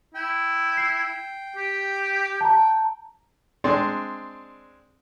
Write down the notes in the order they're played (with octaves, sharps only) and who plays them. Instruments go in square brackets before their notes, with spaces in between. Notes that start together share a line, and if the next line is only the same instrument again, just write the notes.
[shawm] E4 [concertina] G5
[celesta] C7
[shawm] G4
[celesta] A5 A#5
[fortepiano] G#3 C4 D4